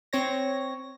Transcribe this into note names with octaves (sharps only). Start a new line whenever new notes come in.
C4 C#5 A#6